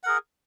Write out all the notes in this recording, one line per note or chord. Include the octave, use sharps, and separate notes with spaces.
G#4 A#4 F#5